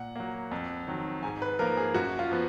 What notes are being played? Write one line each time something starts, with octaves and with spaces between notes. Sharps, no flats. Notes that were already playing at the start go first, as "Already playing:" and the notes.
Already playing: A#2 F#5
F#3 A#3
F2
D#3 F#3
G#2 G#5
B4
F3 A#3 A#4
G#4
F#2 F#4
F4
F3 B3